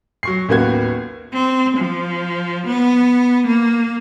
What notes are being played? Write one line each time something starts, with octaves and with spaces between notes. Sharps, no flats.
F#3 C#6 C7
A1 D#2 A#3 B3 F#4 G#6
C4
F3
B3
A#3